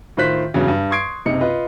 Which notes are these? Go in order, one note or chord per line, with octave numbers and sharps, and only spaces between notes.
A2 D#3 F4 C5 F#6 B6
E2 G2 C#3 F#3
G2
C6 C#6 D#6 G#6 C7 D7
F#1 C3 D#4 C#7
F4 B4 D#5